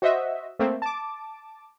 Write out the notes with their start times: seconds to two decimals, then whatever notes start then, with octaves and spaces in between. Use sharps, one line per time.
0.02 F#4 C5 D#5 E5
0.59 A3 A#3 C4
0.82 A5 D6